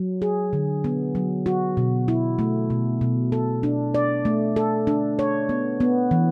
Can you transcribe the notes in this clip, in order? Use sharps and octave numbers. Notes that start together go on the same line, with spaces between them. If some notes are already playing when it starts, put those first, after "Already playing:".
Already playing: F#3
G#4
D3
B3
F#3
F#4
B2
E4
A3
B2
B2
A4
D4
D5
A3
A4
D4
C#5
B3
B3
E3